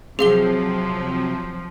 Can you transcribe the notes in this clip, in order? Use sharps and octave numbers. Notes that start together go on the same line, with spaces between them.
C3 F3 F#3 C4 G#4 F5 G7